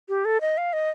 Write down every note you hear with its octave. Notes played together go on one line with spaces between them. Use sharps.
G4
A4
D#5
F5
D#5